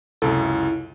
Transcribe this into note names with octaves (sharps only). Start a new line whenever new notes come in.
C#2 F#2 C3 E4 A4